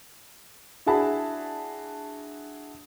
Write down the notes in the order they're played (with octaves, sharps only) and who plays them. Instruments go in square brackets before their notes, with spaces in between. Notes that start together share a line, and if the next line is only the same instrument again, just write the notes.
[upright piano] D4 E4 F#4 G#4 A5 B5